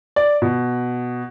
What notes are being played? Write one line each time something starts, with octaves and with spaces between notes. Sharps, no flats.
D5
B2